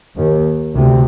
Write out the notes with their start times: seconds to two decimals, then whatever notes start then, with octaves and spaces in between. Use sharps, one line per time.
0.16 D#2
0.74 D2 C3